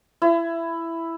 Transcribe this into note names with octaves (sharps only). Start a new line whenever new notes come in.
E4